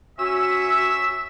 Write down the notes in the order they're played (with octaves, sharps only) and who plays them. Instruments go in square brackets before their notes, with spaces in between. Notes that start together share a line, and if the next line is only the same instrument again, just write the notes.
[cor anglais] C#4 [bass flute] F#4 [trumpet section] E5 [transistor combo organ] E6